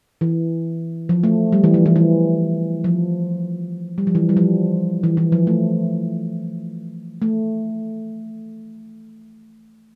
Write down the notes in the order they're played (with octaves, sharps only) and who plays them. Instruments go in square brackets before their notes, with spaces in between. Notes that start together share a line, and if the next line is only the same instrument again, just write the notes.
[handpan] E3
F3
A3
G3
E3
F3
E3
E3
F3
G3
F3
E3
G3
F3
E3
E3
F3
A3
A3